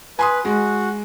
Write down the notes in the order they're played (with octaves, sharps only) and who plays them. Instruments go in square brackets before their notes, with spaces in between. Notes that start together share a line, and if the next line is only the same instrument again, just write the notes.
[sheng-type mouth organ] B4 [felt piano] G#5 C6 D#6
[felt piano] G#3 [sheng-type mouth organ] F#4